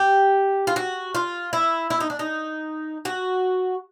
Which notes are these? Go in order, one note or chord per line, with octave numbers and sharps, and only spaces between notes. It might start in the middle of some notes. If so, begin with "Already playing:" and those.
Already playing: G4
F4
F#4
F4
E4
E4
D#4
D4
D#4
F#4